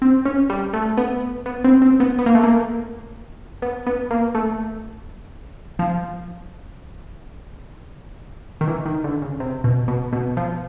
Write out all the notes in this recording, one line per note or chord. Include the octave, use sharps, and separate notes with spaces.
C4
C#4
G3
A3
B3
B3
C4
C4
B3
B3
A#3
A3
A#3
B3
B3
A#3
A3
F3
D#3
E3
D#3
D3
C#3
C3
B2
B2
B2
F3